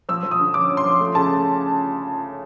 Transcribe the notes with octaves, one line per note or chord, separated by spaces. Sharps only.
F3 E6
F3
D#6
D3
C#4 D6
C#4
C6
F3
A3
C#3 A5